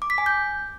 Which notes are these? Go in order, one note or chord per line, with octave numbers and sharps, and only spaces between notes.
D6
B6
G#5
G6